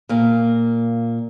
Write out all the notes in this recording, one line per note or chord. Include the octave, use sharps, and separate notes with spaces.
A#2 A#3